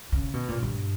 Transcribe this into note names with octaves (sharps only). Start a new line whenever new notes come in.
C#3
B2
A#2
G2